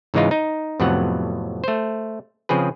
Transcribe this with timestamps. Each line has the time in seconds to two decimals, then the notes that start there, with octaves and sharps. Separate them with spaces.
0.14 G#2 C#3 E3 G#3 D#4 F4
0.31 D#4
0.80 F2 A2 C3 F#3 B3 F#5
1.64 A3 C5
2.49 C#3 F3 C4 G#4 B4